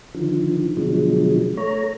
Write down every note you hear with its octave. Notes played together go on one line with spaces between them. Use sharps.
D3 D#3 F3
B2 D3 F3 F#3 G#3
A3 C#5 A#5